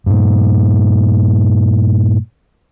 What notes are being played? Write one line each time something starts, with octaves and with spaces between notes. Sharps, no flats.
G2 A#2